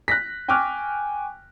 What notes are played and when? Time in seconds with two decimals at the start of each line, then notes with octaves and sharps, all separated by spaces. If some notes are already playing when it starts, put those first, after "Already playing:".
0.08 F#6 A#6 B6
0.48 G5 G#5 C#6 D6 F6 F#6